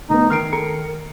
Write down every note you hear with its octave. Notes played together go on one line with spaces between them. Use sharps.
F1 B3 D#4
D#3 F6 C7 D7
A4 A#5 C#7